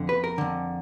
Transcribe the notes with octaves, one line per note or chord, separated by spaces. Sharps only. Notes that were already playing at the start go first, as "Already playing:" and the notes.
Already playing: F2 D3
B4
A#4
F2 D3